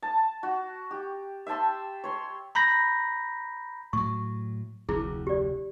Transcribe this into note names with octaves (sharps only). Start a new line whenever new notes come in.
A5
F#4
G4
E5 G5 A5 C6
C#5 C6
A#5 B5 G6 A#6
A2 F#3 C#6
F1 D2 E4 G#4
G4 D5